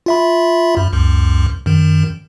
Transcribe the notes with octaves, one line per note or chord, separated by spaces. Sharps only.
F4 E5 B5
F#2
C#2 F#2
F#2 D#3